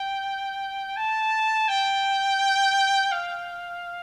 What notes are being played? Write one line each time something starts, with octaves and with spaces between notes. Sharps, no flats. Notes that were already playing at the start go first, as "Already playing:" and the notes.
Already playing: G5
A5
G5
F5